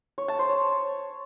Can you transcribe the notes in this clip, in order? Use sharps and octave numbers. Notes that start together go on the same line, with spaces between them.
C#5
A5
C5
C#5